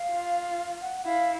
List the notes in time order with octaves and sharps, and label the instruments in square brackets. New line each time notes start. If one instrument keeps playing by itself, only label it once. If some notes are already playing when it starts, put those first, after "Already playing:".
Already playing: [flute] F5
[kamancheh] F4
[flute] F#5
F#5
[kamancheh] E4 [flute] F5